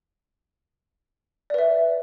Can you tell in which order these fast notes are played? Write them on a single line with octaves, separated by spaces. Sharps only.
D5 B4 E5